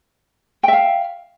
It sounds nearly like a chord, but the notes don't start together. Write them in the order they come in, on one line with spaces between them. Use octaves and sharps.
G5 E5 F5